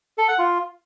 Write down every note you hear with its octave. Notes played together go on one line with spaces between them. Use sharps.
A4
F#5
F4